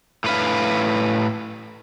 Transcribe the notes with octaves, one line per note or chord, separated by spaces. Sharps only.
A2 B4 F5